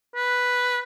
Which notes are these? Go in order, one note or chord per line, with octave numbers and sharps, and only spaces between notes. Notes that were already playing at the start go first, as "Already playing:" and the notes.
B4